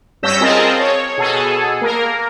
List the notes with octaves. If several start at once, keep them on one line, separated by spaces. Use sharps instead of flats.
G2 C#4 E6 G6 A#6 B6
C4 F4 G#4 A#4 D#5 A5
C#5
B2 G#4 A4
A#3 A#4